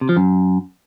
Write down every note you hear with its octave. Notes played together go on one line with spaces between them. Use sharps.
C3
F3
F#2